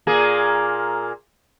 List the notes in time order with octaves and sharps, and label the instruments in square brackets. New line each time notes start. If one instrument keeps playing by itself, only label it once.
[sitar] A#2 A#3 G#4